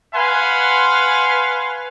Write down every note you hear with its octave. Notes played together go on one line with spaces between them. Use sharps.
B4 F5 F#5 G#5 C6